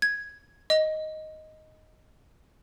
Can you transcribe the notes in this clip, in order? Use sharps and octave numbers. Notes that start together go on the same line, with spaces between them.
G#6
D#5